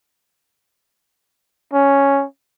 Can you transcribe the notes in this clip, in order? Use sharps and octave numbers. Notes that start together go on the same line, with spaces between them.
C#4